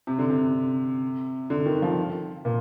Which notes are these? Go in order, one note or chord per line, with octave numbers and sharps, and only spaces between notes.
C3
D3
C3
D3
D#3
F3
A#2